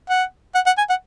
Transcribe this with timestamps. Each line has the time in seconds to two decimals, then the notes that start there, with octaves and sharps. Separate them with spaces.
0.09 F#5
0.55 F#5
0.66 F#5
0.78 G#5
0.89 F#5